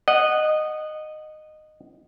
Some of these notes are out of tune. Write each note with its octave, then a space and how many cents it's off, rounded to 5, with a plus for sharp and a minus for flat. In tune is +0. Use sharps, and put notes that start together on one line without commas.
D#5 -15 F#5 +0